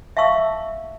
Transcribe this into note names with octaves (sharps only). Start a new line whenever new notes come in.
E5 F5 A5 C#6 E6